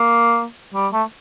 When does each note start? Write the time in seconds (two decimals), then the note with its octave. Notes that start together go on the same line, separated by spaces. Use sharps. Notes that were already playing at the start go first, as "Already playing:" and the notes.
Already playing: A#3
0.74 G3
0.93 A3